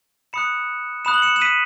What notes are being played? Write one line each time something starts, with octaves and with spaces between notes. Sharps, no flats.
B5 D#6 F#6 C#7 E7
B5 D#6 F#6 E7
F#7
C#7 E7
E7
B6 D#7